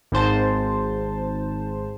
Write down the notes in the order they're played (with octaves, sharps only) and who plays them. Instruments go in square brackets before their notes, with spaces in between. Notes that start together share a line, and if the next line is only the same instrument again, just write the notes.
[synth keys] G#1 G#2 C5 A5